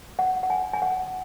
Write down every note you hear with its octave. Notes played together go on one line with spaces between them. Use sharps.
F#5
F#5
G#5
G#5
F#5